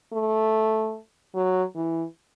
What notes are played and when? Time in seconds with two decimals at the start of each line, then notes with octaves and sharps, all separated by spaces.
0.13 A3
1.35 F#3
1.76 E3